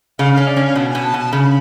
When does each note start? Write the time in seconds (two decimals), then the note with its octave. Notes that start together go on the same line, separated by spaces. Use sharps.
0.19 C#3 F5
0.33 C#4 F5
0.47 D5
0.56 C#4
0.62 F5
0.76 B2
0.89 G#5
0.95 B2
1.04 A5
1.14 B2 A5
1.32 C#3 B5